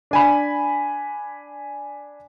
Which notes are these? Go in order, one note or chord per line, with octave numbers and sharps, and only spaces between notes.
D4 G#5 B5